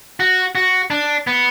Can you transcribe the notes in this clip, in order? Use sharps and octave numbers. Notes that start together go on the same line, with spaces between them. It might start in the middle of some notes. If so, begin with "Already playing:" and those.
F#4
F#4
D4
B3